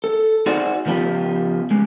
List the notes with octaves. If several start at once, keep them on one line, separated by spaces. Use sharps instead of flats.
A4
D#4 F#4 G#4 C5 D5 F#5
C#3 F3 B3 F4 G4
C#2 G#3